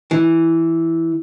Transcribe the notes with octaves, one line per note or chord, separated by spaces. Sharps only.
E3